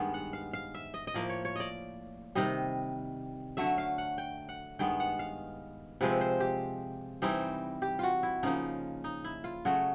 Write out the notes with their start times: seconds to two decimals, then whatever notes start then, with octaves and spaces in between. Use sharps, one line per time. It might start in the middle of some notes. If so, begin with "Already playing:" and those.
Already playing: G2 D#3 G#3 B3
0.14 F#5
0.33 F5
0.53 F5
0.74 E5
0.94 D#5
1.07 D#5
1.14 A2 F3 A#3 D5
1.29 C#5
1.45 C#5
1.56 D5 D#5
2.35 C3 D#3 G3 D#5
3.57 D3 F#3 A3 E5
3.78 F5
3.98 F#5
4.18 G5
4.49 F#5
4.79 G2 D#3 G#3 B3 G5
5.00 F#5
5.19 F5
6.01 C3 F3 G#3 C4 B4
6.21 C5
6.40 G4
7.22 E3 G3 C4 D#4
7.82 G4
7.99 F4 F#4
8.23 E4
8.43 C#3 F3 A#3 D#4
9.04 D#4
9.24 E4
9.44 F4
9.65 C#3 F#3 A3 F#4